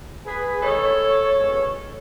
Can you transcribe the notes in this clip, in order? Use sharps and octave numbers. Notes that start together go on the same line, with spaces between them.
G#4 B4
D#3 G#3 D#4 A4 C#5
B2 G#3 C#4